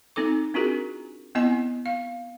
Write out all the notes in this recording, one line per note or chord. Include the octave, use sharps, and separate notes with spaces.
C4 D#4 A4 D6
C4 D4 F4 F#4 G#4 A#4
B3 C4 E4 D#5 G#5
F5